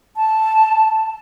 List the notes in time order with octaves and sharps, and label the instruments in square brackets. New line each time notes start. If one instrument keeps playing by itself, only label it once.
[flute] A5